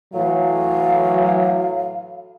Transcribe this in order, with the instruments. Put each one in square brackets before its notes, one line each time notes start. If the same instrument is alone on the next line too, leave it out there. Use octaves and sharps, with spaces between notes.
[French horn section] A2 E3 F#3 [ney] F5